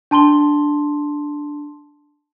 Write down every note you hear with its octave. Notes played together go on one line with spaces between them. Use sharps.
D4 A5 C6 G7